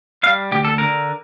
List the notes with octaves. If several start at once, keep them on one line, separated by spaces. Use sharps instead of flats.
G3 F5
D2 G4
A4
D3 A#4